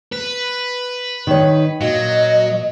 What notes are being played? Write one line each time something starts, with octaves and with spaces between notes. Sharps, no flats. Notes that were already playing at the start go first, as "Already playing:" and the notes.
B4
D#3 C#5
A#2 F#3 D#5